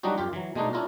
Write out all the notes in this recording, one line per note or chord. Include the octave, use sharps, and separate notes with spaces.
F#3 G3 D4 D#4 F#4
F#2 F4 G4
E3 F#3
B2 G#3 A3 D4 D#4
C#4 D4 E4 F4 A#4